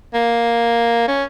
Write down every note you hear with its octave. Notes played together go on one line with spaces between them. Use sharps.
A#3
C#4